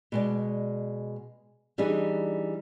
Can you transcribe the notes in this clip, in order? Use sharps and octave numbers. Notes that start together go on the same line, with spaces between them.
B2 G#3 D5
E3 G3 D4 D#4 G#4